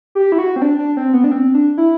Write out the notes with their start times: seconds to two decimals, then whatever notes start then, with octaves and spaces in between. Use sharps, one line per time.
0.15 G4
0.32 E4
0.38 F#4
0.56 C4
0.62 D4
0.79 D4
0.97 C4
1.13 B3
1.24 D4
1.31 C4
1.54 D4
1.78 E4